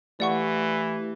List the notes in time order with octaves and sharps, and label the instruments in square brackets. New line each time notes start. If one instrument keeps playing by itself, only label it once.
[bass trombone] E3 [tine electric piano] A3 G4 F5 [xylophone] D5 F#5 C#6